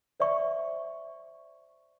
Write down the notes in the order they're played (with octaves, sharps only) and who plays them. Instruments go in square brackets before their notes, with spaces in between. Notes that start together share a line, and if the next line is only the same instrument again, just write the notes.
[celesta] C5 D5 E5 C#6